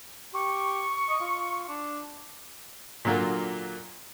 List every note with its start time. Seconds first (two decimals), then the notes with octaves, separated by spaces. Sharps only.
0.34 G4 C#6
1.09 D#5
1.20 F4
1.69 D4
3.05 A#2 D3 F#3 A#3 F4